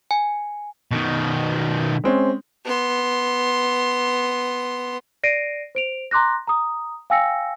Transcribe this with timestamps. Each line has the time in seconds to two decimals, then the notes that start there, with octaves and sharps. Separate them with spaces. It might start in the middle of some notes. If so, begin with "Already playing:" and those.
0.11 G#5
0.91 B2 D#3
2.04 G#3 C4 C#4
2.64 B3 C6
5.23 D5 A#6 C7 D7 D#7
5.75 C5 D7 F7
6.11 A#5 C6 D6 F#6 A#6
6.47 A#5 D#6
7.10 F5 G5 G#5 E6 A#6 C#7